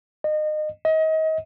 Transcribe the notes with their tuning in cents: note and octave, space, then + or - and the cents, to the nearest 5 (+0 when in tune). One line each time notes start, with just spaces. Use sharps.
D#5 -30
D#5 +30